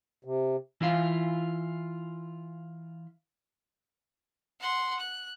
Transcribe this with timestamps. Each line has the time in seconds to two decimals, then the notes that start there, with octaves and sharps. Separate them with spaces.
0.24 C3
0.81 E3 E4 F4 F5
4.60 F#5 C6
5.00 F#6